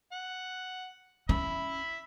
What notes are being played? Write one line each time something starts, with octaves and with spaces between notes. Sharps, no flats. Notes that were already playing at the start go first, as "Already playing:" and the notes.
F#5
C#4 E5 B5